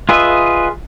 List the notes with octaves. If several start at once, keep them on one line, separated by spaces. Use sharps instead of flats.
F4 G#4 B4 D#5 E5